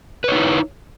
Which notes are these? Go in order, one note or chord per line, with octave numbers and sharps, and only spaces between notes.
D#4 E4 B4 C#5